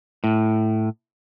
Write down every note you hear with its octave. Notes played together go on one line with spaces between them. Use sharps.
A2